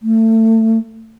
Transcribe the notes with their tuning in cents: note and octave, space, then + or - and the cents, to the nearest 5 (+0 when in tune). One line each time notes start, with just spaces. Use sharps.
A3 +25